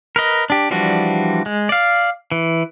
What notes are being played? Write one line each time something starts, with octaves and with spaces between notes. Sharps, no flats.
A#4 B4 D#5
D4 G4
E3 F3 G3 D4 F#4
G#3
D5 F5
E3